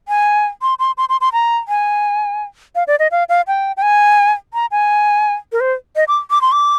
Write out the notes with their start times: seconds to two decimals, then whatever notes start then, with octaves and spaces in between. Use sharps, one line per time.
0.08 G#5
0.62 C6
0.79 C6
0.98 C6
1.09 C6
1.21 C6
1.33 A#5
1.68 G#5
2.75 F5
2.87 D5
2.99 D#5
3.11 F5
3.29 F5
3.47 G5
3.77 G5
3.82 G#5
4.54 A#5
4.71 G#5
5.52 A#4
5.60 C5
5.96 D#5
6.08 D6
6.30 D6
6.41 C6
6.52 D6